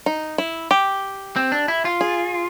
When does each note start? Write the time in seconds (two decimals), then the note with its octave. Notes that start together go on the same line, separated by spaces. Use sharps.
0.06 D#4
0.38 E4
0.71 G4
1.36 C4
1.52 D4
1.68 E4
1.85 F4
2.01 G#4